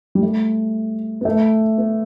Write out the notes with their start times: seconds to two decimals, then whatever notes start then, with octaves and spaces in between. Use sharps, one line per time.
0.15 G3
0.23 A3
1.21 B3
1.25 A3
1.78 B3